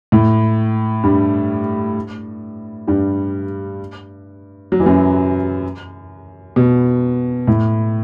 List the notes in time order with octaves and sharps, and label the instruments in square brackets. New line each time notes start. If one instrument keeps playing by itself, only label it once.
[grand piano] A2
G2 G3
G2 G3
F#3
E3
F#2 F#3
B2
A2